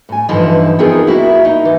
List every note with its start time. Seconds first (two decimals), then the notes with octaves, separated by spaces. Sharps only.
0.09 A2 G#5
0.29 G2 D3 E3 F3 D#4 E4
0.79 B3 C4 D#4 F4 G#4 A#4
1.07 A#3 E4 F#4 E5
1.45 D#4
1.65 E3